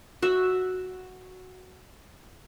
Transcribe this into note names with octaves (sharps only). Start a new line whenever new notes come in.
F#4 E5